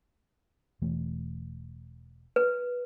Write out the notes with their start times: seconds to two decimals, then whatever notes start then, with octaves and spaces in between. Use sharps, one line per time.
0.82 E1 E3 A3
2.36 B4